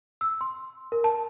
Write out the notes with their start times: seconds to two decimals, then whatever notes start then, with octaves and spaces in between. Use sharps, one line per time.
0.21 E6
0.41 C6
0.92 A#4
1.04 A5